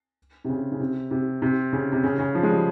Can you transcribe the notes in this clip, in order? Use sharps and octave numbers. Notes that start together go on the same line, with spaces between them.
C3
C#3
C#3
C3
C3
C3
C#3
C3
C#3
C#3
F3
G#3
G3